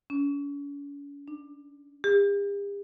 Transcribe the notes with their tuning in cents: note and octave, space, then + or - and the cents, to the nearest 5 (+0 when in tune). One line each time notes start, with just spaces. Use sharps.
C#4 +45
D4 +30
G4 +45